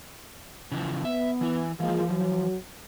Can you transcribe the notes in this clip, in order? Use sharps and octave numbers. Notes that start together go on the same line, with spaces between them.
C#3 E3 F3
B3 E5
E3 E4
E3 F3 G#3 A#3 F4
F#3